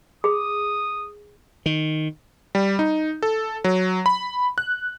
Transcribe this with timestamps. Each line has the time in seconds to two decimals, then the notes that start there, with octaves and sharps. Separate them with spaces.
0.24 G#4 D#6
1.66 D#3
2.55 G3
2.79 D#4
3.22 A4
3.64 F#3
4.06 B5
4.58 F#6